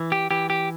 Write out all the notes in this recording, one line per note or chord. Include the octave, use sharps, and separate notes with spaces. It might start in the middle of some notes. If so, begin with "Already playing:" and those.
Already playing: E3
G4
E3 G4
G4